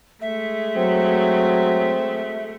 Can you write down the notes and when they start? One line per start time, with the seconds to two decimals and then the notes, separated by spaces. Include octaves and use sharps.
0.21 G#3 A3 E5
0.77 F#3 C4